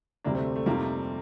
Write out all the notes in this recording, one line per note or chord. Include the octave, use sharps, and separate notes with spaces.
D2 C3 G3 A#3 D4
A3 C4
A3
F2 C3 F3 G3 A#3